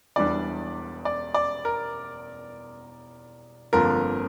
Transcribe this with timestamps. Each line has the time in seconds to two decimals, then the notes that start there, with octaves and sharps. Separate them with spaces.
0.16 E1 E2 E3 G3 D4 D5
1.05 D5
1.34 D5
1.65 A#4
3.73 G1 F2 D3 F3 A#3 A#4